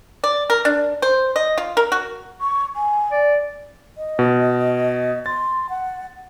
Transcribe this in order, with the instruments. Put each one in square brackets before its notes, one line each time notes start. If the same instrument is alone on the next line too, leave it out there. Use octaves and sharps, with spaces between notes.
[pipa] D5
A#4
D4
C5
D#5
F4
A#4
F#4
[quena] C#6
G#5
[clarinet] D5
[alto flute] D#5
[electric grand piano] B2
[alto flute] C6 [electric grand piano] A6
[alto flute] F#5